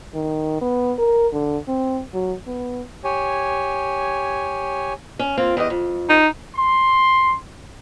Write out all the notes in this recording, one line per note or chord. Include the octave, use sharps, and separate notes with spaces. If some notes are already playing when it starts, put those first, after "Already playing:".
D#3
B3
A#4
D3
C4
F#3
B3
G4 C#5 G#5
C#4
A#3 C4 F4
E2 G4 D#5
F2
D#4
C6